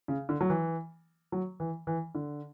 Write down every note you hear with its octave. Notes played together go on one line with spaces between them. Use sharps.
C#3
D3
F#3
E3
F#3
E3
E3
D3